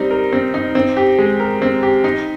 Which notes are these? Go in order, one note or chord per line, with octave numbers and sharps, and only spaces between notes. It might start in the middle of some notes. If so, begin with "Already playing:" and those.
Already playing: G3 C4 D#4
A#4
C4
D#4
C4
G4
G#3
A#4
C4
G4
D#4